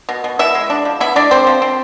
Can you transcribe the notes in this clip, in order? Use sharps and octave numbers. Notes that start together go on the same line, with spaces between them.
B2
B2
B3 E4 E5
G#3
D4
F3
B3 E4 E5
G#3 D4 D5
C4 D4 C5
F3
C4